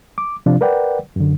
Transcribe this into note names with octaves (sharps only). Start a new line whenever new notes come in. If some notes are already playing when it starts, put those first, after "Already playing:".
D6
C3 F3 D4 F4
A#4 B4 D5 F#5 G5
F#2 D3